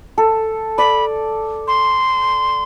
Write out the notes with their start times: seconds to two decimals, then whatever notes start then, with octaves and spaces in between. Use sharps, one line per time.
0.18 A4
0.78 D5 B5
1.68 C6